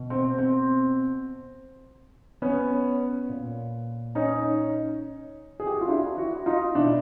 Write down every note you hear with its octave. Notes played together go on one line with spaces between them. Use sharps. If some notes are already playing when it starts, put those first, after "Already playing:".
Already playing: B2
C4
C4
B3 C#4
A#2
C#4 D#4
G#4
G4
F#4
F4
D4 E4
E4 F#4
D#4 F4
B2 D4 E4